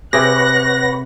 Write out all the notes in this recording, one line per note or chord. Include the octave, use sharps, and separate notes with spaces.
C3 G4 G#4 B4 C#5 F#5 F#6 A#6